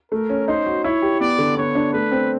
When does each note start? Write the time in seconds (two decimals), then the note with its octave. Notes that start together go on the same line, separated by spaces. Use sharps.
0.12 A3 A#4
0.29 C#4
0.48 D#4 C5
0.66 F#4
0.84 E4 C#5
1.02 G4
1.20 B3 D5
1.39 D3
1.57 B3 C#5
1.75 D4
1.93 A3 B4
2.11 C4